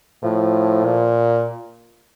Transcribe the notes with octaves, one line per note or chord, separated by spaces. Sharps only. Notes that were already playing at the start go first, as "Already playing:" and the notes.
A2 F3
A#2